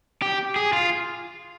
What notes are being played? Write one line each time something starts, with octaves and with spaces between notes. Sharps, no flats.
G4
G#4
F4